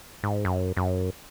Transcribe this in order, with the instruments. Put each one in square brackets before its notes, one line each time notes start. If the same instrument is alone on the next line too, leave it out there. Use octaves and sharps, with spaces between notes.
[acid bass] G#2
F#2
F#2